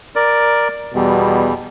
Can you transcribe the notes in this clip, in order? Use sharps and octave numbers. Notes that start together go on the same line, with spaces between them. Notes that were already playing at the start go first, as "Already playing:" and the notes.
A#4 D5
E2 B2 G3